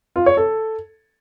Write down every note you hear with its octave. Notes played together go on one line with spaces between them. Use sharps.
F4
C#5
A4